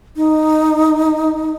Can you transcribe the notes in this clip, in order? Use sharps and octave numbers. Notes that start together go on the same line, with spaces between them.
D#4